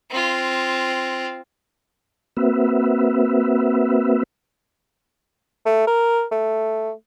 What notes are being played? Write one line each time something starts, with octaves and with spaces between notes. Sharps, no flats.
C4 F4
A#3 C4 F#4 B4 E5
A3
A#4
A3